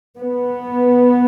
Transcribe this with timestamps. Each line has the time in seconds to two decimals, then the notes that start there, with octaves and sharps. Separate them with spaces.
0.18 B3